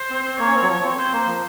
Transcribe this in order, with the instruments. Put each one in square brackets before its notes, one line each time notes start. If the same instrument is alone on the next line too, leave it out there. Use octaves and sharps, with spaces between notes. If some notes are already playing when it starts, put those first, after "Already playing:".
Already playing: [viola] C5
[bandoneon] C4
C4
[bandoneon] A#3 [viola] C#5
[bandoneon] C#4
C4
F#3
F3
C4
[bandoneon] C4 [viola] C5
[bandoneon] A#3
F3